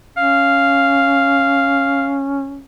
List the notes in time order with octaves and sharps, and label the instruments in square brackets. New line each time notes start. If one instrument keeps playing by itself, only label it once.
[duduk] C#4 [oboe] F5